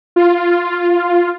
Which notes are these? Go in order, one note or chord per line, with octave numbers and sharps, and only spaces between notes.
F4